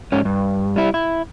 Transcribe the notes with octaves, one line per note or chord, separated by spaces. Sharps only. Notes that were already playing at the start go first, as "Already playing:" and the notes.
G#2 C#4
G2
G3 E4
E4